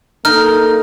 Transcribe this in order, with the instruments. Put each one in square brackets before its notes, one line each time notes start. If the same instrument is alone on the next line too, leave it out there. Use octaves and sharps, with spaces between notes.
[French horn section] A#3 A4 [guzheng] D#4 [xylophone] F6